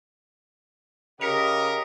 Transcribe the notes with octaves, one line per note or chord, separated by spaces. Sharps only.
C#3 G4 A#4 D#5 B6 C#7 F7